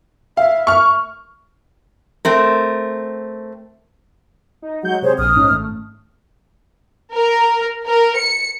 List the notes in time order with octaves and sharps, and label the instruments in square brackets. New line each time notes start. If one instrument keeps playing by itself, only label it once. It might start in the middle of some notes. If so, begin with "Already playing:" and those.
[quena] E5 [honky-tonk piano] F5
[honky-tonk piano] C#6 F6
[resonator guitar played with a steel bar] A3 C4 A#4
[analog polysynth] D#4
[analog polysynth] F#3 G#3 G6 [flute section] F#5
[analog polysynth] C3 [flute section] G#4 C5 C#5
[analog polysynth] A#1 [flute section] D#6 F6
[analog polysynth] G#2 C#4 D#4
G#1 A3
[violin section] A#4
A#4
C#7